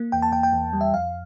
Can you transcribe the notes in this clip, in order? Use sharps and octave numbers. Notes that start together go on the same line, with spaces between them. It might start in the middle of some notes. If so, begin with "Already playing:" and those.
Already playing: A#3
E2 G5
A5
E2 G5
G5
E2
G3
E5
F2 F5